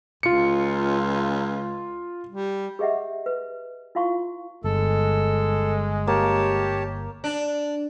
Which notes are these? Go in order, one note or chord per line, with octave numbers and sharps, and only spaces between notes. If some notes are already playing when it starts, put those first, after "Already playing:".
C#2 F4 C#7
G3
G4 G#4 D#5 E5 F#5
B4
E4 F4 F5 C6 C#6
G1 G#3 A4
A#3 G4 C#5 A5
D4